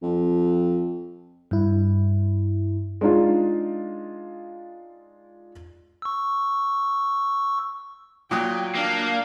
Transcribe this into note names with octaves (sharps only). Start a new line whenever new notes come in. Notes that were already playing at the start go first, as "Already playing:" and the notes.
F2
G2 E4
G#3 D4 D#4 F4
C#6 E6
A#2 F#3 G5 D#6
A#3 D4 F5